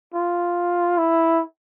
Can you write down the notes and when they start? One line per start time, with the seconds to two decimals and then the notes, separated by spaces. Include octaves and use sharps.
0.14 F4
0.98 E4